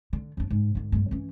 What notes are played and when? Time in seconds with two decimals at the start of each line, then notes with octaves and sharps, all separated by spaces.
0.13 D3
0.37 F2 D4
0.50 G#2
0.75 G#2 D3
0.92 G2 D3
1.11 E3 C#4